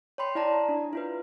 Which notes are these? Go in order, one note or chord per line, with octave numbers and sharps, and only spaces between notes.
C#5 G5 B5 C6
E4 D5 A5 A#5
D4
E4 F4 B4